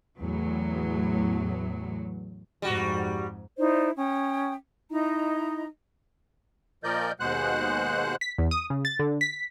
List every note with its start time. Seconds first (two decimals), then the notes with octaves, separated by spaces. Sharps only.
0.20 E2 A2 F#3
2.62 F2 G#2 G3 F#4
3.58 D#4 E4 C5 D5
3.97 C#4 G5 D#6
4.91 D#4 E4 D#5 A#5
6.84 A#2 F3 A#4 D5 D#5 G6
7.20 D#2 B2 G#3 C5 F#5 F#6
8.21 B6
8.38 E2
8.51 D#6
8.70 C#3
8.85 A6
8.99 D3
9.21 B6